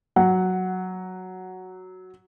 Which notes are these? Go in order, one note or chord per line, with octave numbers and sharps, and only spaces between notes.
F#3 F#5